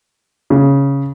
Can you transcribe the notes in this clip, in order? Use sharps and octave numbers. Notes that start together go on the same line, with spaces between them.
C#3